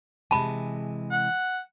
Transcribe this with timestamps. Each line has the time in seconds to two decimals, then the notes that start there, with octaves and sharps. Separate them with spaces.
0.31 C3 E3 G#3 A5 B5
1.11 F#5